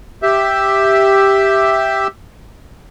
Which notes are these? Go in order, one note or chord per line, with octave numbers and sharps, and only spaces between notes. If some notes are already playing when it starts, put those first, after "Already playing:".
G4 E5